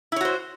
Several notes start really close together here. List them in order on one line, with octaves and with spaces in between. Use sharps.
E4 C#5 F#4 C5